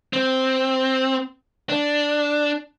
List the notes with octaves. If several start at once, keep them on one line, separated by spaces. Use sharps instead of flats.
C4
D4